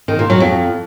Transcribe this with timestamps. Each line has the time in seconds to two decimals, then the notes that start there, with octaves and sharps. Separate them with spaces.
0.08 D#3
0.19 A#2
0.30 F#3
0.40 F2